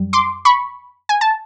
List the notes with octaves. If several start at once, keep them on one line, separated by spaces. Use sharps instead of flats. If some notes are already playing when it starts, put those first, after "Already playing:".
Already playing: F#2 G3
C6 D6
B5 C#6
G#5
A5